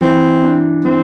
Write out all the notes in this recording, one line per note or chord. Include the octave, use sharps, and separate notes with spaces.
E3 C4
D4
E3 C4